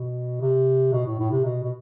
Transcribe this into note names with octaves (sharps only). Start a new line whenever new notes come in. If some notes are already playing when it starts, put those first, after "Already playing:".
Already playing: B2
C3
B2
A2
A2
C3
B2
B2